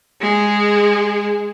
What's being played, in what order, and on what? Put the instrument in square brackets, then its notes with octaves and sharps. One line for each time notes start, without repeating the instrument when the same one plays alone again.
[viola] G#3 G#4